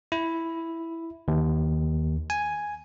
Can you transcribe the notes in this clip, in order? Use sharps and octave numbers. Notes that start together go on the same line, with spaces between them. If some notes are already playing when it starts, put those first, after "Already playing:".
E4
D#2
G#5